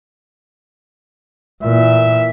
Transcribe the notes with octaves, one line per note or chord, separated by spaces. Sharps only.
A#2 E3 E5